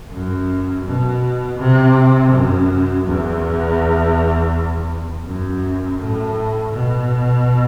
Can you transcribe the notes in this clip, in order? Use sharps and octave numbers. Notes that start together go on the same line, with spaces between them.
F#2
B2
C3
F#2
E2
F#2
A2
B2